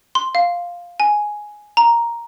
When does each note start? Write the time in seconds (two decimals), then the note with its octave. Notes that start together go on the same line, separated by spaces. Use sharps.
0.15 C6
0.35 F5
1.00 G#5
1.77 A#5